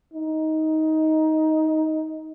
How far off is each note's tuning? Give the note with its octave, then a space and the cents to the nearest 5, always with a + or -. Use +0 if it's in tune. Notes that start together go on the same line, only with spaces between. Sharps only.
D#4 +15